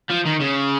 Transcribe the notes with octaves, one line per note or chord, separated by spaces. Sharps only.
F3
D#3
C#3